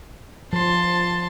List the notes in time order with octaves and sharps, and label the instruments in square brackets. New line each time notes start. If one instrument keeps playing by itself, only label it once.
[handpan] F3 [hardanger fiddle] A5 C6